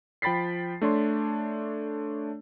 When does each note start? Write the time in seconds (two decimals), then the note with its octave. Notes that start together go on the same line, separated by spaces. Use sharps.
0.22 F3 G5 B5 A6 B6 C7
0.82 A3 D4 C#5 C6